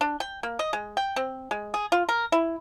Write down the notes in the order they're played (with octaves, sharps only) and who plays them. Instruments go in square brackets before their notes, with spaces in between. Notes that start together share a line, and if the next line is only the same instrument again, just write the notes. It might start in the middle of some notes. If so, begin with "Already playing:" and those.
[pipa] D4
G5
A#3
D#5
G#3
G5
C4
G#3
G#4
F4
A#4
E4